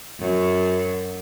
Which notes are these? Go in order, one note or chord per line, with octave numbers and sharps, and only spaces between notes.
F#2